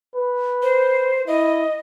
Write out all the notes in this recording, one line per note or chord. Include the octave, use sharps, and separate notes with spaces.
B4
C5
E4 D#5